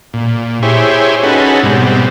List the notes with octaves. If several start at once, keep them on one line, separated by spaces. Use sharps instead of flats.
A#2
E4 G4 G#4 C5 C#5
C#4 D#4 F#4 G#4 A4 B4
G#2 B2 G3 C4